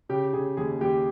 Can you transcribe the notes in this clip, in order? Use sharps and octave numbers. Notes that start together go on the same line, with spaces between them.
C#3 G4
C#3 G#4
D#2 G#4
D#2 G4